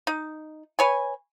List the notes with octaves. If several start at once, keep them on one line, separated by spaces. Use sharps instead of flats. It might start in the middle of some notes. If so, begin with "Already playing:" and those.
D#4
B4 C#5 G#5